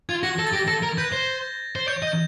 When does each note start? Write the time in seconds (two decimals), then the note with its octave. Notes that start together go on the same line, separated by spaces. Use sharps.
0.09 F4 G#6
0.23 F#4 A#6
0.38 A4 A#6
0.47 A6
0.53 G4
0.56 A#6
0.68 A4 A#6
0.82 A#4
0.98 B4 G6
1.12 C5
1.76 C5
1.87 C#5 G6
2.02 D#5
2.07 G6